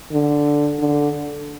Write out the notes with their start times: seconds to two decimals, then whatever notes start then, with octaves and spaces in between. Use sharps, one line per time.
0.12 D3
0.79 D3